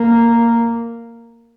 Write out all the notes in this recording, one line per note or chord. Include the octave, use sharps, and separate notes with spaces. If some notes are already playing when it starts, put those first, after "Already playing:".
Already playing: A#3